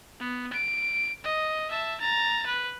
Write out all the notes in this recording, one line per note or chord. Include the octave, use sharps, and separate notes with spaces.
B3
D7
D#5
E5 A5
A#5 A6
B4